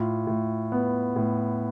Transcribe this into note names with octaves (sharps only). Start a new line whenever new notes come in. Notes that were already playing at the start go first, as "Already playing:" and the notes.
Already playing: A2 F4
A2
B3
A2